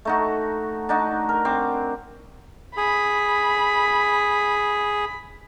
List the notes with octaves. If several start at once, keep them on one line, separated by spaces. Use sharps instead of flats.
A3 D#4 F#4
D4 D#4 F#4
A#4
C4 D6
G#4 B5